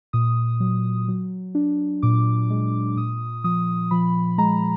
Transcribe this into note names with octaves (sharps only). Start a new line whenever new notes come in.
A#2 D#6
F#3
F#3
D4
A#2 D6
G#3
A#2 D#6
F3 D#6
F3 B5
G#3 A#5